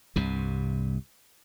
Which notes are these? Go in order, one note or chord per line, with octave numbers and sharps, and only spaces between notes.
C2 G2 C3